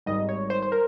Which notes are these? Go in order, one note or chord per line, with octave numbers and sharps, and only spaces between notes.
G#1 G#2 D#3 G3 D#5
C#5
C5
C5
A#4